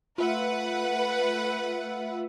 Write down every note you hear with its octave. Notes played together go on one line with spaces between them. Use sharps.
A3 F4 B4 E5 F#5